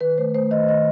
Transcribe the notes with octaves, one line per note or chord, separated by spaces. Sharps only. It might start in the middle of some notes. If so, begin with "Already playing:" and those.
D#3 B4
A3 C5
A3 C5
D#3 D#5
D#3 D#5